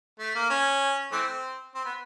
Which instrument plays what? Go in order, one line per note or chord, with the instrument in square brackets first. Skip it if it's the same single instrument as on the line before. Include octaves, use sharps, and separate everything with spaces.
[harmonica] A3
A#3
C#4
E3 A3 C4
C4
B3